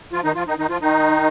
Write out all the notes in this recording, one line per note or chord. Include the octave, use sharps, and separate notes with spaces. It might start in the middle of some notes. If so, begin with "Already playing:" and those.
F3 F4
D#3 D#4
F3 F4
D#3 D#4
D#3 D#4
F3 F4
D#3 D#4